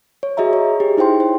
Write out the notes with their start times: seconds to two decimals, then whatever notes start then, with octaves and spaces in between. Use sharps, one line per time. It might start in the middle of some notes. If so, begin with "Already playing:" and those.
0.23 C#5
0.37 F#4 G#4 D#5 E5 A#5
0.53 C#5
0.80 G4 G#4
0.97 D#4 E4 C5 G5 C6
1.20 C5